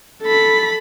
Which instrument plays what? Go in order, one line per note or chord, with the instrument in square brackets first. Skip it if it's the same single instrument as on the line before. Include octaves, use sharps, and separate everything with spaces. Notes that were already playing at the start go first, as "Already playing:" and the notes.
[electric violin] A4 B5